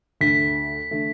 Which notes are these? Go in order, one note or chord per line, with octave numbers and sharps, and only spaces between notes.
D2 D3 A3 B6
D3 A3